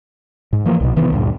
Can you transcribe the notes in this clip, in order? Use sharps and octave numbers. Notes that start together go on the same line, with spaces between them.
G#2
E3 F3 A#3
C2 B2
C3 D#3 E3 B3
D2 G2 A#2